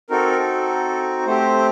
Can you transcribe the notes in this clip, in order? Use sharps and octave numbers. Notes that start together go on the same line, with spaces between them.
C4 D#4 F#4 A4 A#4
A#4
A4
A3 C4 G4 C5